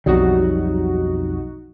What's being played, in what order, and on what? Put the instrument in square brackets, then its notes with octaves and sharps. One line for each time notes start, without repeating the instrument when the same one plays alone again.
[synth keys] B1 D#4 F#4 [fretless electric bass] F2 F#3 G3